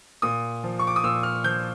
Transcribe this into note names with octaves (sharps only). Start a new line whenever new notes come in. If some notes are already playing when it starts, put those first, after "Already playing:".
A#2 D#6
F3
C#6
D6
D#6
A#2 E6
F6
F3 G6